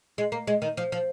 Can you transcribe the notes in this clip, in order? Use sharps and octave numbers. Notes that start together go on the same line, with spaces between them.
G#3
A#3
G#3
D#3
F3
F3